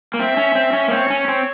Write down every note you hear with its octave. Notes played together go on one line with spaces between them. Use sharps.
A#3
C4 E5
C#4
C4
C#4
A#3
C4 C#5
C#4
C4